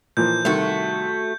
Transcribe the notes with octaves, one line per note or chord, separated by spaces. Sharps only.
A#2 E3 F3 G6
C2 D#3 A3 F#4